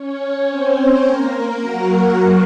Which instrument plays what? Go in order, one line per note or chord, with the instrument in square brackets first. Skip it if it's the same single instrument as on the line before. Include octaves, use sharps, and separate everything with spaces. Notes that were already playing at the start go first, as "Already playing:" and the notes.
Already playing: [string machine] C#4 C#5
C4 C5
A#3 A#4
F#3 F#4